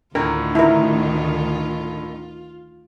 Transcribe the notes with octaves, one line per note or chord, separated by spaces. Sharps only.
D2 A2 D3 D#3 F4 A#4
E4 A#4